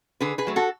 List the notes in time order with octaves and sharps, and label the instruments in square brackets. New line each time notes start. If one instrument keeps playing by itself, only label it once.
[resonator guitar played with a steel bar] D3 G#4 B4
G#4 B4
F#3 A3
F#4 A4